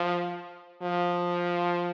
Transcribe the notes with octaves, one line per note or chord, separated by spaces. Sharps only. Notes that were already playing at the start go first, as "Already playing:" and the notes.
Already playing: F3
F3